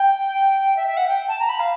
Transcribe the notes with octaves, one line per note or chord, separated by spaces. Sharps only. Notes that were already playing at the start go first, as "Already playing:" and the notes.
Already playing: G5
E5
E5
F#5
G5
A5
A#5
B5
F5